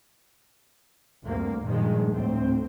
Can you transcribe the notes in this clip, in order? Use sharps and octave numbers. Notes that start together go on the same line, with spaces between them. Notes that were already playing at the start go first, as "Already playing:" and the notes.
D2 G2 C3 A#3
G2 A#2 D#3 F3 G#3
D2 A2 C4